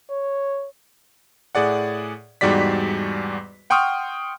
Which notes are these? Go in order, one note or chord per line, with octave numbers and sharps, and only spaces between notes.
C#5
A2 G#4 D5 F#5
E2 G#2 G3 F#4 D5 B6
F#5 G5 C6 C#6 D#6 F6